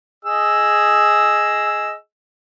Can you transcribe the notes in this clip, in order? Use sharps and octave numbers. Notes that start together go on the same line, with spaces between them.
G#4 D#5 E6